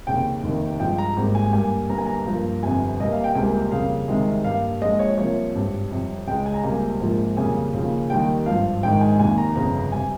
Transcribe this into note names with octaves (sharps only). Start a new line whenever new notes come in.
F1 D#2 C#3 G5
F1 D#2 D#3
G2 F3 G#3 G5
A#5
G#1 G#2 G3 A#3
G#5
G2 G3 A#3 G#5
G1 G2 G3 A#3 A#5
G#5
A#5
G2 F3 A#3
G1 F2 C3 G3 G#5
C2 C3 G3 A#3 D#5
F5
G5
C#2 C3 G3 A#3 G#5
F2 C#3 G3 A#3 F5
C2 C3 D#3 G#3
G2 G3 A#3 F5
A#1 A#2 G#3 D#5
C#5
C2 C3 F3 A#3 C#5
G#1 G2 G3
F2 C3 G3
C#2 C#3 G#3 G5
G#5
A#5
C#2 C3 G3 A#3 G#5
A#1 G#2 F3 A#3
F2 C#3 G3 A#3 G#5
D#2 C#3 F3 A#3
D#2 D#3 G3 A#3 G5
G#1 G2 F3 F5
A#1 G#2 D#3 G#3 G5
G#5
F1 D#2 D#3 A#3 G#5
A#5
G1 F2 C#3 A#5
C3 G3 G#5